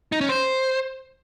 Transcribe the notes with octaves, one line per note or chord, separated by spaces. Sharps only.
D#4
C#4
C5